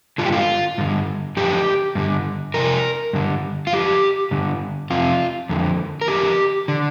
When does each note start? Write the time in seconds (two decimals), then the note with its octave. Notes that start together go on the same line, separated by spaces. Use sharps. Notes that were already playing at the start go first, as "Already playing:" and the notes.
0.18 G2 D3 F4
0.26 G4
0.32 F4
0.78 G2 D3
1.37 F2 D3 G4
1.95 G2 D3
2.54 F2 C3 A#4
3.13 G2 D3
3.67 F4
3.73 F2 D3 G4
4.31 G2 D3
4.90 F2 C3 F4
5.49 F2 D3
6.01 A#4
6.08 F2 D3 G4
6.68 D3